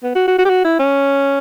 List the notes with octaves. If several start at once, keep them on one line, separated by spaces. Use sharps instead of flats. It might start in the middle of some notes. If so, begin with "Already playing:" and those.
B3
F#4
F#4
F#4
G4
F#4
E4
C#4